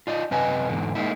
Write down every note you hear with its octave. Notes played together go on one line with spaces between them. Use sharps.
F4 D5 D#5
F#2 C3 B4 D#5 G#5
E2 G#2 D3
G#3 A#3 D#4 E4